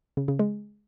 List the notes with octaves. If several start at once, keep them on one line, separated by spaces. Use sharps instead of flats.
C#3
C#3
G#3